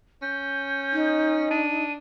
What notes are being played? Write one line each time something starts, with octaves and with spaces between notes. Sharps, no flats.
C#4 G6
D#4
D4 D#7